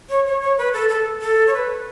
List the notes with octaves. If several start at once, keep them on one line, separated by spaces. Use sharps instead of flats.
C#5
C#5
C#5
B4
A4
A4
A4
C#5
B4